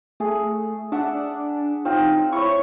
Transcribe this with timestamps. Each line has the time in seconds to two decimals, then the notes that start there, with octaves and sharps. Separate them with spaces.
0.20 A3 G#4
0.92 D4 E5 F#5
1.85 C4 D#4 F4
2.32 E4 C#5 C#6